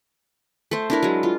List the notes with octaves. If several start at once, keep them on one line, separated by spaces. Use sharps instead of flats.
A3 C5
D4 E4 A#4
F#3 G#3
F4